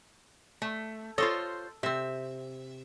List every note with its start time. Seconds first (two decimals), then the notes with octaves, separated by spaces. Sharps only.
0.62 A3
1.18 F4 A4 C5 C#5 D#5
1.83 C3 C4 E5